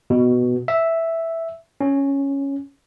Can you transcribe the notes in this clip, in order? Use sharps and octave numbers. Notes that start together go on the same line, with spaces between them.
B2
E5
C#4